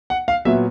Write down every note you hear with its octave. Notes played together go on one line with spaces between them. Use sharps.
F#5
F5
A#2 F#3 B3 E5